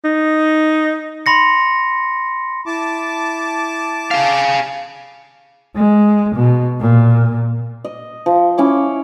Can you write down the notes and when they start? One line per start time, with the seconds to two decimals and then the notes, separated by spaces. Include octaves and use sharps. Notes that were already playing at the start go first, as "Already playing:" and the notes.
0.04 D#4
1.26 B5 C6 A#6 C#7
2.66 E4 A5 D6
4.11 G#4 F5
5.75 G#3
6.35 B2
6.80 A#2
7.85 D#5
8.26 F3
8.58 C#4 E4 D6